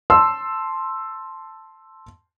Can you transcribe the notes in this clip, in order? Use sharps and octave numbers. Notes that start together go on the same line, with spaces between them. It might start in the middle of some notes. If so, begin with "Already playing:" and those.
A5 C6 E6